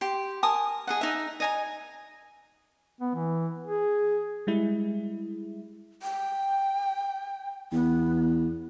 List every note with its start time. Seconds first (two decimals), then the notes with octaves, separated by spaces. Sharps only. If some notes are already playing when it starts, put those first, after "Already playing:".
0.01 G4 G5 C6
0.43 A#4 G#5 A5 D#6
0.87 G#4 D#5 F#5
1.01 D#4 E5
1.40 D#5 G#5 A#5
3.01 B3
3.15 E3
3.67 G#4
4.47 G3 G#3 E4
6.02 G5
7.72 E2 B3